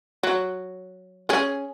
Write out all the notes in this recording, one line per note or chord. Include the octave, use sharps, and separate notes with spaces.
F#3
C#4 G#4